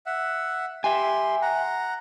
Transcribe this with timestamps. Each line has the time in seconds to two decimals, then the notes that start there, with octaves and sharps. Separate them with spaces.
0.06 E5 F#5
0.84 G4 E5 G#5 C6
1.42 F#5 A#5